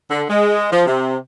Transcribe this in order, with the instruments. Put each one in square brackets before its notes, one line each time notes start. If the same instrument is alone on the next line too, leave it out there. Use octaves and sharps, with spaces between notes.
[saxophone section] D3
G#3
F3
C3